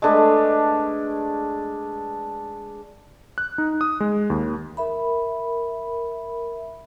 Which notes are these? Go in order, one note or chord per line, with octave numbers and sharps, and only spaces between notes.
G#3 A3 D4 B4
F#6
D#4
D#6
G#3
D#2
A#4 E5 B5